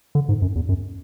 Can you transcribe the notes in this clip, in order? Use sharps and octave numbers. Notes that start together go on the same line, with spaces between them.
D3
G#2
F#2
E2
F#2